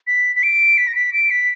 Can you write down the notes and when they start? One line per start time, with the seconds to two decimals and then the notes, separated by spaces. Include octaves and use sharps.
0.07 B6
0.36 B6
0.43 D7
0.78 B6
0.88 A#6
0.95 B6
1.13 D7
1.31 B6